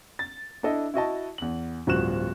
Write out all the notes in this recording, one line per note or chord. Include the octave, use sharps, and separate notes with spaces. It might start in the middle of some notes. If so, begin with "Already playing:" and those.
A6
D4 E4 A4 D#5
E4 F#4 D#5 A5
E2 F#7
D1 G2 F3 F#4 F#6 E7